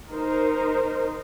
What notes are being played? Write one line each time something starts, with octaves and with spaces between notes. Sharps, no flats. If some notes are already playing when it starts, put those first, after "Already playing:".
D#4 A#4 C5